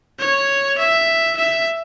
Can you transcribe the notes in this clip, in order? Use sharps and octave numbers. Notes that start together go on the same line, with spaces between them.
C#5
E5
E5